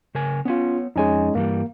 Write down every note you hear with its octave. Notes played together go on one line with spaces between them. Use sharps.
C#3 A#4 G#5
B3 C#4 F4 C#5
F2 G#3 C#4 D#4 G#5
G2 E3 G3 A#3